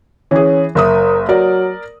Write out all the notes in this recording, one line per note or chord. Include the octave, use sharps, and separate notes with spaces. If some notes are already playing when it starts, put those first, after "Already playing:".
E3 C#4 G#4
F#1 A#4 E5 D#6
F#3 A#4 D5